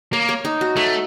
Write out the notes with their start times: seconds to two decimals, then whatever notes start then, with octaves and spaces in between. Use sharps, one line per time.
0.13 A#3 C#5
0.29 C#5
0.45 D#4
0.61 F#4
0.76 A3 C#5